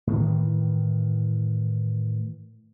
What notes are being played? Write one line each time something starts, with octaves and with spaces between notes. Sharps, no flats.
A2 D#3 E3